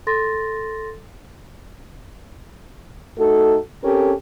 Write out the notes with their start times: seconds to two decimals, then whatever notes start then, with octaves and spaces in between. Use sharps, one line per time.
0.07 A4 C6 A6 A#6
3.18 A3 D#4 F#4 A4
3.83 C4 C#4 G4 A4 A#4